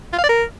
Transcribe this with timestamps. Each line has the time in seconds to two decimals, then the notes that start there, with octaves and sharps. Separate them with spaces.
0.13 F4
0.18 F5
0.24 D5
0.29 A#4